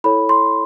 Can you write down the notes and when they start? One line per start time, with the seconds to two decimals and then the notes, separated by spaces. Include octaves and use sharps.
0.04 E4 A4 C#5 B5
0.29 C6